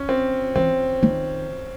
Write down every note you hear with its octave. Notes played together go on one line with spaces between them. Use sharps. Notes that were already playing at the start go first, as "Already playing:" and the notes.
Already playing: C#4
C4
E3 C4
D#3